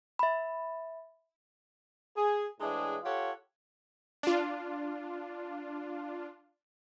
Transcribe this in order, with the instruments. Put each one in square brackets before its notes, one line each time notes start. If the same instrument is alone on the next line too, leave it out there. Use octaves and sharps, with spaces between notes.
[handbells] E5 B5
[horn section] G#4
A2 E3 G#3 D4 G#4
F4 G4 A4 C#5 F#5
[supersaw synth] D4 F4